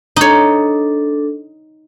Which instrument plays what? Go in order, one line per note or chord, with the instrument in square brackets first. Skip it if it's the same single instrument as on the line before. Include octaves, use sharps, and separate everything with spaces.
[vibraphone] D4 A4 [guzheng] D#4 C#5